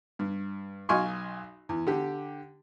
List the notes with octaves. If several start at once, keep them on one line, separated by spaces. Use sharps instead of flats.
G2
B1 D#5 F5 G#5 C6 C#6
E2
D3 G4